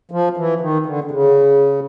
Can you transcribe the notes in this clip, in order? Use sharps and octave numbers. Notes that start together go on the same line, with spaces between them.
F3
E3
D#3
D3
D3
C#3